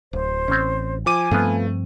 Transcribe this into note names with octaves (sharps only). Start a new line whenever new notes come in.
D1 C5
A1 C4 C#4
F3 G#5 D6 D#7
G2 F3 A3 B3 C4 F4 F5